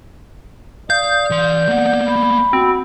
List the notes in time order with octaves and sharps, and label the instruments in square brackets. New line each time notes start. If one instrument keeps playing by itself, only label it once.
[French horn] D5 [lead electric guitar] F5 [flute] D#6 [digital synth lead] G6
[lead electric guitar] E3 C6
[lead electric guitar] A#3 B3 [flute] F#5
[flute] B5
[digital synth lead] C4 [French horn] F#4